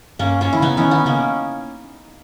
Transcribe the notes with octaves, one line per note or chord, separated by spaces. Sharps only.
G2 A#3 C#4
A#3 C#4
D#3 E4
C#3 B3 D#4
E3 C#4 E4
D#3
B3 D#4
C#3 A#3 C#4